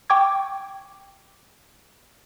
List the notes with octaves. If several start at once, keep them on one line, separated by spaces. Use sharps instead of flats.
G5 C#6 D6 G#6